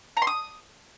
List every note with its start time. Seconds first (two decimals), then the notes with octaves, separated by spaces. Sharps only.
0.17 A#5
0.22 C6
0.27 D#6